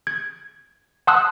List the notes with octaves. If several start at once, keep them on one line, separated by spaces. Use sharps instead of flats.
G#6
F#5 A5 C6 D#6 E6 F#6